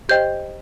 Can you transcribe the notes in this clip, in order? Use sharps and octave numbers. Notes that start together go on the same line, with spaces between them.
G4 C5 D#5 G5 G6